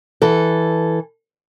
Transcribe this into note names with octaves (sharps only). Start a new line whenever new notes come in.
E3 A4